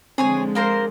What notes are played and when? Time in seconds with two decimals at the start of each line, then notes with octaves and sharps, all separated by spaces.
0.18 D3 F3 G#3 C4 G#4 C#5 G#5
0.55 A#3 A#4 C5